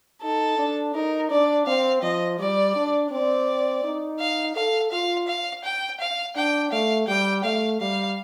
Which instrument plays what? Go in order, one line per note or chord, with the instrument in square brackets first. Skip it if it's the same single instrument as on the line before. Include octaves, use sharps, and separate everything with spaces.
[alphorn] D#4 [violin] A4
[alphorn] D4
[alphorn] D#4 [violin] A#4
[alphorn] D4 [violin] D5
[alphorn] C4 [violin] F5
[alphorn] F3 [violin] D#5
[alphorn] G3 [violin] D5
[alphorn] D4
[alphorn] C4 [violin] D5
[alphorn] D#4
[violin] F5
[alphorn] A4 [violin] F5
[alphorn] F4 [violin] F5
[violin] F5
G5
F5
[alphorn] D4 [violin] G5
[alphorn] A3 [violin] F5
[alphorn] G3 [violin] G5
[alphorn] A3 [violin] F5
[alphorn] G3 [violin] F5